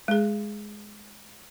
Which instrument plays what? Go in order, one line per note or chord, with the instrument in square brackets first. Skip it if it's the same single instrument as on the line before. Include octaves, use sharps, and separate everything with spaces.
[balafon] G#3 G#4